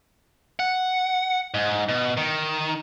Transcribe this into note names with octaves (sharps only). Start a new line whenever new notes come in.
F#5
G#2
B2
D#3